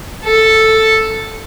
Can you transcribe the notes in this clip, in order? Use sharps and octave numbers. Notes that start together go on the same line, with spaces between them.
A4